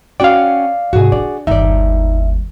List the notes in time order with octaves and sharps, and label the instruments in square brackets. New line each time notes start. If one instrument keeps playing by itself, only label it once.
[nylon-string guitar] C#4 F#4 G5 [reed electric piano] D5 F5
[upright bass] G#2 C3 [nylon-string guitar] F#4 G#4
[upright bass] D4 [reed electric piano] D5
[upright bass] G1 D#2 [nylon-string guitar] D#4 D5 [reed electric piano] E5